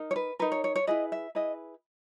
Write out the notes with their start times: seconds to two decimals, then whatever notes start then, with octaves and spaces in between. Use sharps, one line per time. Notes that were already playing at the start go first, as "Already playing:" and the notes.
Already playing: D#4 A#4
0.11 C#5
0.16 B4
0.39 D#4 A#4 B4
0.52 C#5
0.64 C#5
0.76 C#5
0.87 E4 G#4 B4 D#5
1.12 E5
1.35 E4 G#4 B4 D#5